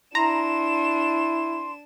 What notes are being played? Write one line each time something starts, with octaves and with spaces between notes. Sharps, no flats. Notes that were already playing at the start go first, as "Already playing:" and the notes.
D4 E4 A#5 C6 E7